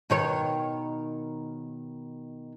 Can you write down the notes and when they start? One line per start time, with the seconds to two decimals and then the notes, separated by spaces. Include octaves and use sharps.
0.10 B2 D#3 C#5